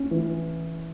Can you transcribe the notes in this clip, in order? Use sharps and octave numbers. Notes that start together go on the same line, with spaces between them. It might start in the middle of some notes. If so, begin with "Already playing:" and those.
Already playing: C#4
E3